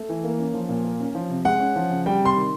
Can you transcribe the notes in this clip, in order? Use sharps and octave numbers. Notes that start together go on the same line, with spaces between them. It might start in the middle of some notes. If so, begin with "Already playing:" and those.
Already playing: A3
E3
A#3
C#4
F3
A#2
A#3
C#4
F3
C3
G#3 F#5
C#4
F3
C#3
G3 G5
C3 C6
D#3